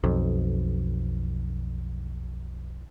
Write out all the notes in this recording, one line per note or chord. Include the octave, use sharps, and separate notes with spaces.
B1 F2